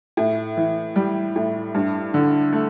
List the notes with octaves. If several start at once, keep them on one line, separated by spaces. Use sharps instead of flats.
A2
E3
G3
A2
G2
D3
A3